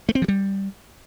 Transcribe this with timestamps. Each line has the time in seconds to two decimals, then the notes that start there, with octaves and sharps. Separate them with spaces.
0.09 A3
0.15 C4
0.22 F3
0.28 G3